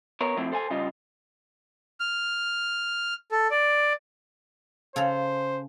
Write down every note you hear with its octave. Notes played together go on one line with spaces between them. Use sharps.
B3 A#4 C#5
F3 A3 C4 E4
A4 C5 F#5 G#5
C#3 G3 F4 D#5
F6
A4
D5
C#3 A4 C5 A#5